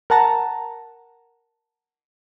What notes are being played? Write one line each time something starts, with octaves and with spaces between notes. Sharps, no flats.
A#4 F#5 A5 A#5